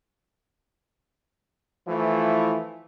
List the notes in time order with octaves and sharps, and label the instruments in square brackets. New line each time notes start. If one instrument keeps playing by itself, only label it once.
[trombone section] E3 F3 A3 E4 F4